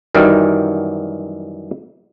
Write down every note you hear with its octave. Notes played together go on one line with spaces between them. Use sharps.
F#2 D#3 E3 F#3 G3